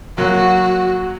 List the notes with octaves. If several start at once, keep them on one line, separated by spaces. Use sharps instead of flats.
F#3 A#3 F#4